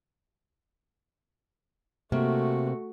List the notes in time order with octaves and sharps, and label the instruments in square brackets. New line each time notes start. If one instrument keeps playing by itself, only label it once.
[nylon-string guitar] C3 A#3 [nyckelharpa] A3 F#4